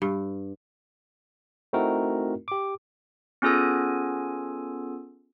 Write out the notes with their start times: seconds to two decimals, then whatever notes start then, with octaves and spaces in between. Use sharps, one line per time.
0.02 G2
1.73 A3 C4 D#4 E4 F#4 A#4
2.48 G4 D6
3.42 B3 C#4 F4 G#4 A4 G#5